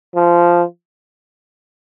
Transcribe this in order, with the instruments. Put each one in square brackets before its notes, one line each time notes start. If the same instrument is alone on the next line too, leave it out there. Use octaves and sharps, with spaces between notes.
[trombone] F3